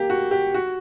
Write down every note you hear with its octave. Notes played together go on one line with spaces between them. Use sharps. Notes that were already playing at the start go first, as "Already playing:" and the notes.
Already playing: A#3 G4
F#4
G4
F#4